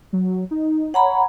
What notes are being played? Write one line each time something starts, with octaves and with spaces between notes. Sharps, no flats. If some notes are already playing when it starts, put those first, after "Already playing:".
F#3
D#4
C#5 F#5 A#5 B5